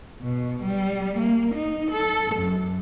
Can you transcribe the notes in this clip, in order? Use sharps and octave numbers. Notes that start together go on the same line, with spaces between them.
B2
G3
A#3
D#4
A4
F#2